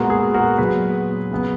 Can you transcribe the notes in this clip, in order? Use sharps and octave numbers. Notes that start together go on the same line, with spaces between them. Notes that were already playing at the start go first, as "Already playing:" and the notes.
Already playing: A#2 G#3 B3 F#4 A#4
G#4
F#4 A#4
A#2 F#3 B3 G#4 B4
C#3 F#3 B3